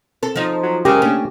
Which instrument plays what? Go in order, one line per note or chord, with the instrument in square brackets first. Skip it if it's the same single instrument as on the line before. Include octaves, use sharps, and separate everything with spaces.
[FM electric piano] C4 A5 [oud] A4
[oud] F3 D#4
[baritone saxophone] F#3
[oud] F#2 G#3 A#4 [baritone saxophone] C#3 [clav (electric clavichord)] G4
[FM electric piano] A3 A#3 D4 [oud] C#4